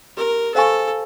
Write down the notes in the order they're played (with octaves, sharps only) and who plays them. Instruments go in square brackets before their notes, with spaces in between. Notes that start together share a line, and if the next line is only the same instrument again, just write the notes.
[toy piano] G4 [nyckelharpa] A#4
[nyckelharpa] A4 [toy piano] C5 F5 G#5 C#6